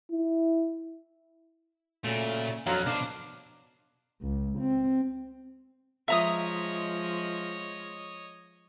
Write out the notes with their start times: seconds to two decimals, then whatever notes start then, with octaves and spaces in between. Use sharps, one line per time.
0.11 E4
2.05 A#2 C#3 F#3 A3
2.67 F2 D3 F#3 F4 F5
2.86 B2 D4 C5
4.21 C#2
4.59 C4
6.08 F3 G#3 C#5 D#5 E5 A#5 D#6